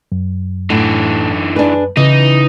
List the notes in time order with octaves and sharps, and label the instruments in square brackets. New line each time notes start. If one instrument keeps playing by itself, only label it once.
[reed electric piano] F#2
[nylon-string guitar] A2 [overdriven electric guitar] D3 E3
[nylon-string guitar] D4 G#4 B4
[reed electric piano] C#3 [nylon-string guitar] E3 [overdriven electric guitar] D#4